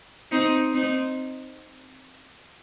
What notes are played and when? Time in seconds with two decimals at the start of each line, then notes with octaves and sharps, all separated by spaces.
0.32 C4 D#4
0.74 C4 D#4